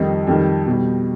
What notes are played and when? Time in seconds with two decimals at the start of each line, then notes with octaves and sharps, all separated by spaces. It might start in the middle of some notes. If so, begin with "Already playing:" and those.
Already playing: F2 D#3 G3 D#4
0.27 F2 D#3 G3
0.66 B2 G3